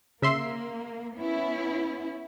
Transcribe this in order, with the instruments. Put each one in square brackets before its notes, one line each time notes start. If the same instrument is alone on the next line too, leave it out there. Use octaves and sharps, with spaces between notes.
[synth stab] C#3 E5 C6 [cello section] A#3
[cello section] B3 C#4 E4